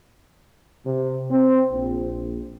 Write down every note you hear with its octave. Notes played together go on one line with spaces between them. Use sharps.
C3
C4
A#1